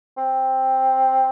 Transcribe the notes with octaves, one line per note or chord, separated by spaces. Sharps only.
C4